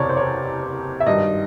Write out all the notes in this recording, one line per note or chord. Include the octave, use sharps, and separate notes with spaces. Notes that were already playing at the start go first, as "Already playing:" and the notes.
Already playing: F#1 E2 C3 C#5 D5
C5
C#5
E5
G#1 G2 D#3 G3 D#5